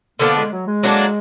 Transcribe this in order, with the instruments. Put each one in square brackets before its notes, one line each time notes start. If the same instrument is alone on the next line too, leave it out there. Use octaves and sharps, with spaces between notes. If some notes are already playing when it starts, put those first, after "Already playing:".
[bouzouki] D3 F3 B3 D4 [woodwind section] A#3
[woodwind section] G#3
F#3
G#3
[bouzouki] F#3 A#3 D4